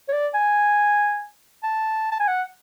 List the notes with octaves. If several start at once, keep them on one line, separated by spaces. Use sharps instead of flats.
C#5
D5
G#5
A5
A5
G#5
F#5